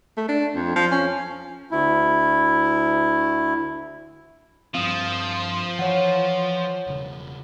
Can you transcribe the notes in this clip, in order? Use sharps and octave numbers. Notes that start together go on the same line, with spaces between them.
A3
D4
F2
F3
C#4
D2 E4
G2 F3 C4 F5 D#6
E3 C#5 F#5
E1 C#3